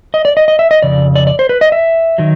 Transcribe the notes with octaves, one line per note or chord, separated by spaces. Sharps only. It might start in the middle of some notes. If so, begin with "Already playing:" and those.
D#5
D5
D#5
D#5
E5
D#5
F2 C#3 D5
D5
D5
C5
B4
D#5
E5
D#3 F#3